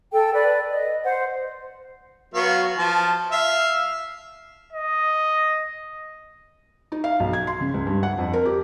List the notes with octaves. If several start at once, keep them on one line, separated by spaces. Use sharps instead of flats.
A4 G5
B4 D5
D#5
C5 F#5
F#3 B3 F5
F3 A5
E5 F5
D#5
D#4
F5
B1
G#6
C6
C#3
C#2
G2
F#5
F2
A#4
G4